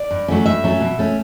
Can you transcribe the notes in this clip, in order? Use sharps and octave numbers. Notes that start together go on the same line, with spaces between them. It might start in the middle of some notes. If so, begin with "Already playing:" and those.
Already playing: D5
G2
F#3 A3 C#4
G2 E5
F#3 A3 C#4
B2
A3 C#4